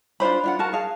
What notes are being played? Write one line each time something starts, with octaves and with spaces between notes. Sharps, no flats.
D4 F4 C5 B5
D4 F4 F#5
F#4 A#4 A5
G#4 F5